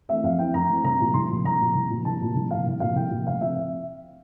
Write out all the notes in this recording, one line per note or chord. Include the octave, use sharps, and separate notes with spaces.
E3 A3 C4 E5
F2 F5
E3 A3 C4 G5
F2 A#5
E3 A3 C4
C2 A#5
A#2 F3
C2 C6
A#2 F3
C2 A#5
A#2 F3
C2
A#2 F3
C2 A5
A#2 F3
C2
A#2 F3 F5
C2
A#2 F3 F5
C2 G5
A#2 F3
F1 F5
F3 C4 E5